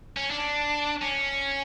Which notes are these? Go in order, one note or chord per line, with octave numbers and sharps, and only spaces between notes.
C#4
D4
C#4